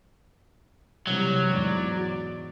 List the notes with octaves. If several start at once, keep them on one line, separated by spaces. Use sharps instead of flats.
C3 E3 F#3 G3
E2 G#2 D5